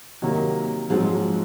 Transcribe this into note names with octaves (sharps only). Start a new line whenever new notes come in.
C3 D#3 F#3 A#3
G#2 F3 F#3 G#3 C4